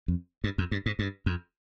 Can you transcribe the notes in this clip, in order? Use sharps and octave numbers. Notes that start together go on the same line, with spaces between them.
F2
G2
F2
G2
G#2
G2
F2